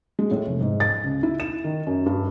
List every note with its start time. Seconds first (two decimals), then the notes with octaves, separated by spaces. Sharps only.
0.19 G#3
0.31 A2
0.47 F1
0.61 G#2
0.80 A6
1.04 C#2
1.23 E4
1.40 E7
1.64 D#3
1.87 F#2
2.06 G2